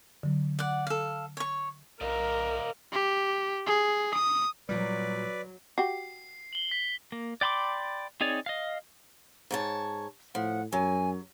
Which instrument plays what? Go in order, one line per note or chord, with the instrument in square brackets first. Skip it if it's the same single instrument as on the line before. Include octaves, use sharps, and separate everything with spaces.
[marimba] D3 F#3
[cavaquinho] D5 F#5
A4 F5
C#5 C#6
[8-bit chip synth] B1 [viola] A#4 [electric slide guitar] D5 D#5 F5
[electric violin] G4
G#4
D#6
[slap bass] A#2 G3 [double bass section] F#3 [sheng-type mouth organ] B4 D5
[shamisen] F#4 G4 [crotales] C7
[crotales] F#7 G7
B6
[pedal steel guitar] A#3
D5 G5 B5 C6 D6
C4 D#4 G#4 C#5 D5
D#5 F5
[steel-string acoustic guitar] G#2 C#5 A5
[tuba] A2 [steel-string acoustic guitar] F3 [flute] F#5
[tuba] F#2 [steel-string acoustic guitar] F#3 [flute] G#5